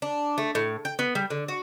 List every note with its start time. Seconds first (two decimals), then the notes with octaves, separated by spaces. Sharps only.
0.02 D4
0.38 A3
0.55 A2
0.85 G5
0.99 B3
1.15 G3
1.30 D3
1.48 F#4